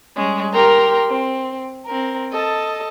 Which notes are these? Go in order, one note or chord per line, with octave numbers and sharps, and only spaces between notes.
G3 G#3 C#4
G4 A#4 G5 A#5 C6
C4
C4 A#4
A4 D#5 A5